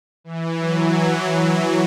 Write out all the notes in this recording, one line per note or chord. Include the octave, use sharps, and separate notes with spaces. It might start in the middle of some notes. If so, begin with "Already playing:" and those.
E3
F#3
E3
E3